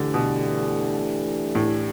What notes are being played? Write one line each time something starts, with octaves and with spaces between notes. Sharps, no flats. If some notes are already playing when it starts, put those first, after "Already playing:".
Already playing: D3 E3 A3 D4 G4
B2
A2